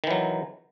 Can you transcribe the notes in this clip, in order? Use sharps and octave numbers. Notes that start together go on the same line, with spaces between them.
D#3 E3 F#3